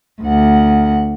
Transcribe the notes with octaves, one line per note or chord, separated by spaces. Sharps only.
D2 F#5